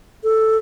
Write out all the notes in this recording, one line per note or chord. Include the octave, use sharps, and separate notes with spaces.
A4